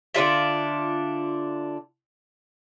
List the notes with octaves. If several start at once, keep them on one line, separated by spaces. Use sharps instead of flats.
D3 D4 F4 E5